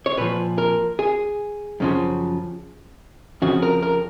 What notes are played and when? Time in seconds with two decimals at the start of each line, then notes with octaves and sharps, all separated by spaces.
0.06 C#5
0.17 A#2 F3 B4
0.58 A#4
0.99 G#4
1.80 F#2 C#3 F3
3.42 F2 C#3 F3 F#4
3.62 A#4
3.82 A#4